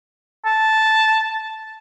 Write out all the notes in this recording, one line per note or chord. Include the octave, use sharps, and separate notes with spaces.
A5